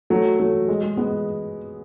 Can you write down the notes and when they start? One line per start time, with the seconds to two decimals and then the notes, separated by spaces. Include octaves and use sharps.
0.10 F#3 A3
0.40 F#3 A3
0.68 G#3
0.83 G#3
0.97 G#3 B3